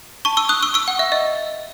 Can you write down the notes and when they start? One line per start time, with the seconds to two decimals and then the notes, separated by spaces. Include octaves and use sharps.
0.25 A5 C#6
0.37 C#6 E6
0.49 D#6 F#6
0.62 C#6 E6
0.74 C#6 E6
0.88 F#5
0.99 E5
1.12 D#5